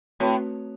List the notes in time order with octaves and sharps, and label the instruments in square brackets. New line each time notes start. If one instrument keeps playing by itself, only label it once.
[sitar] A2 [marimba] A3 C4 F#4 B4